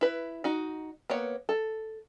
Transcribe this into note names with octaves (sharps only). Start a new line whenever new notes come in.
E4 B4
D#4 F#4
A#3 B3 C#5
A4